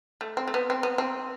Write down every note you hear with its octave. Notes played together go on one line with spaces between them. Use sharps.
A3
C4
A3
B3
C4
B3
C4